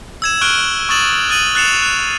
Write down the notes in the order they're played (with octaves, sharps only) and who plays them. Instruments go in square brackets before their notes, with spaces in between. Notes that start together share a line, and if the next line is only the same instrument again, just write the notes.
[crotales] E6 G#6 E7
C#6 F6 F#6 D7 G7
C#6 D#6 A6 E7 F#7
D#6 F#6 A6 D#7 F#7
F#6 A6 C7 C#7 E7 F7
F#6